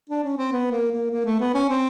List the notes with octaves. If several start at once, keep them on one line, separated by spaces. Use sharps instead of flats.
D4
C#4
C4
B3
A#3
A#3
A#3
A3
B3
C#4
C4